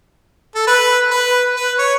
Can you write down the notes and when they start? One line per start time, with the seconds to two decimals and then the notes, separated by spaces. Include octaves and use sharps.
0.55 A4
0.67 B4
1.11 B4
1.56 B4
1.79 C#5